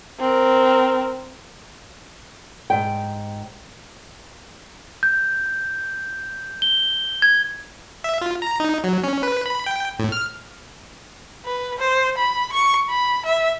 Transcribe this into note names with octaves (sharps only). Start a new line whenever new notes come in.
C4 A#4
G#2 G5
G6
G7
G#6
E5
F4
A#5
D#4
F#3
C#4
B4
B5
G5
A2
F6
B4
C5
B5
C#6
B5
E5